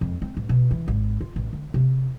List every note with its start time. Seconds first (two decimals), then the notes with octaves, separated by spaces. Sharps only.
0.01 F2
0.22 C4
0.37 A1
0.49 B2
0.71 E3
0.88 G#1
1.21 F4
1.36 A1
1.53 D3
1.74 C3